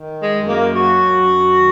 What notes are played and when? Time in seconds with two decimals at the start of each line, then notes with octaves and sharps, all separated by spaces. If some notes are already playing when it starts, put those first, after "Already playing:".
Already playing: D#3
0.21 G#3
0.33 F#2
0.48 A#3
0.75 F#3 F#4
1.15 F#2
1.56 D#3